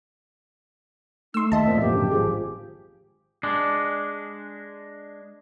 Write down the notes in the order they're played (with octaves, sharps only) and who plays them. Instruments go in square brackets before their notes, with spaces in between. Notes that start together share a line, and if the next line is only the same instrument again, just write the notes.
[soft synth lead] A3 [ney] D#4 [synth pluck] C6 E6
[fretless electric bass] D#2 [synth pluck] D#5 A5 [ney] E5
[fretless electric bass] F2 A#2 F3
[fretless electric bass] F2 A2 A#3 [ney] G4
[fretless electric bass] F#2 D3 [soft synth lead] A2
[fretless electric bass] G#1 D3 F3 [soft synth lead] G#4
[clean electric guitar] G#3 D4